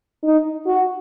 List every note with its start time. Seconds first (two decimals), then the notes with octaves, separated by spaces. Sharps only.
0.24 D#4
0.66 F#4